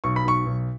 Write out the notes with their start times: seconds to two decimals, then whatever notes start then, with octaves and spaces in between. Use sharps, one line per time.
0.04 B1 C#6
0.16 B5
0.25 B1 C#6
0.46 B1